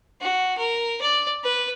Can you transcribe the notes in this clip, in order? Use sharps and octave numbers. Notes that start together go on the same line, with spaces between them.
F#4
A#4
D5
B4